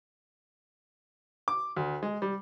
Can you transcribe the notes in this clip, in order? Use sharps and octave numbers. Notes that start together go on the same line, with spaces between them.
D6
D2
G#3
G3